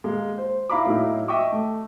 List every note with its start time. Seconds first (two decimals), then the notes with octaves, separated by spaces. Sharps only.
0.04 G#3 A#3
0.38 C5
0.70 E4 F5 A#5 B5 D6
0.86 A2 F#3 A#3 D#4 E4
1.28 D#5 E5 G5 C#6 D6
1.52 A3